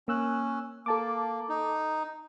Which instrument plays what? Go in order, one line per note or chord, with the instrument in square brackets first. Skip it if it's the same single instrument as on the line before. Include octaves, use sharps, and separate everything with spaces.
[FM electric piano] A#3 E6 F#6 [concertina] C#4
[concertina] A#3 [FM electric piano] A4 A5 D6
[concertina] D#4